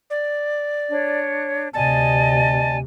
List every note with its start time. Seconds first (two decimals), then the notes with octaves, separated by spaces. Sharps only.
0.10 D5
0.90 D4 C#5
1.74 D2 C3 D5 D#5 G#5 A5